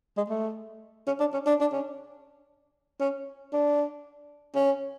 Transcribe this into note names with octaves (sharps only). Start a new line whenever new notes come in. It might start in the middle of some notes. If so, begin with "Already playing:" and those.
G#3
A3
C#4
D4
C#4
D4
D4
C#4
C#4
D4
C#4